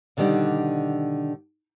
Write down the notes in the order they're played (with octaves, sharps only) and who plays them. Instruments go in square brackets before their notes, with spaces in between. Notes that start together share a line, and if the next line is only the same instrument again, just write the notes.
[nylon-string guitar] B2 D3 D#3 G3 D4